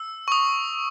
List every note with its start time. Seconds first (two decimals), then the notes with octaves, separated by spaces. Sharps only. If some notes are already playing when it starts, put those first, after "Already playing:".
Already playing: E6
0.28 C#6
0.32 D#6